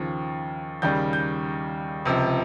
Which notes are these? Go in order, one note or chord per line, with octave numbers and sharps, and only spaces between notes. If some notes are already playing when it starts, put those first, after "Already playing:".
Already playing: D#2 C#3 F3
D#2 C#3 G3 G6
G6
C#2 C3 F3